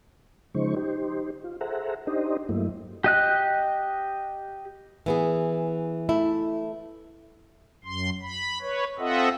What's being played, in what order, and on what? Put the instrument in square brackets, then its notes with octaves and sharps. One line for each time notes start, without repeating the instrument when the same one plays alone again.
[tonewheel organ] C#3 F3 G#3 D#4 C5 C#6
D#4 G4 C5
F4
G#4 A4 C5 E5 F#5 A#5
D4 D#4 G4 C5 D#5
G2 F#3 A3 A#3 E4
[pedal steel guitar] G4 D#5 F#6
[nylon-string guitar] E3 B3 G#4
A3 E4
[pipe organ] F#2 C6
B5
B4 C#5
C4 F4 A4 D#5 E5 F#5